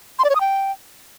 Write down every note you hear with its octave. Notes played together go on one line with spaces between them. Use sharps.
C6
D5
C#5
D#6
G5